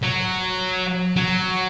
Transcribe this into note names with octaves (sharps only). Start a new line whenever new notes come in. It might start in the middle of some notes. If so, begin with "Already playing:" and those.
F#3
F#3